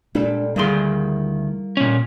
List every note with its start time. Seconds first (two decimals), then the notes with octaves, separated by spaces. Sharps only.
0.15 A#2 G3 G#3 D4 A4
0.56 D2 D#3 G3 A#3 E4 G#4 C6
1.77 A#2 C#4